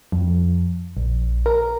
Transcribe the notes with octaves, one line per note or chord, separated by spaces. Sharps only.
F2
A#1
A#4